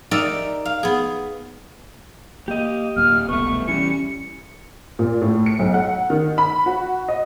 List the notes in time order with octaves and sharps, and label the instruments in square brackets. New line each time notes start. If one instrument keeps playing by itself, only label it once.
[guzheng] D#4 G4 A#4 D5 E5
F5
B3 G#4
[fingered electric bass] A#3 [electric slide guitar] G4 D#5
[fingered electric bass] D1 A#3 [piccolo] F6
[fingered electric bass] E1 C2 [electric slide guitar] A3 B3 [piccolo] C#6
[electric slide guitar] E3 G3 [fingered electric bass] C#4 [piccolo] C#7
[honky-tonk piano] A#2
A2
C#7
B1
F#5
D#3
B5
F#4
D#5